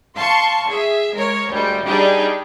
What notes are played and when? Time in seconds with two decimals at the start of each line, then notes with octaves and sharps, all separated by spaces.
0.15 F5 A5 C6 C#6
0.69 G#4 E5
1.15 G#3 A#4 C#5
1.51 D2 G3 G#3
1.85 G3 D4 D#4 G4 G#4